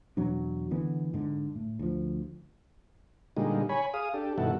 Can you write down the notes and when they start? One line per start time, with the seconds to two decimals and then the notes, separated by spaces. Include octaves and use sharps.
0.17 E2 B2 F#3 D4
0.71 D3 E3 B3
1.14 G#2 D3
1.56 A2
1.79 D2 F3
3.36 A#2 D3 G3 G#3 D#4
3.69 C#5 G#5 B5
3.94 G#4 F5 D#6
4.14 D4 G4 A4
4.38 G2 B2 D#3 E4 F#4 A4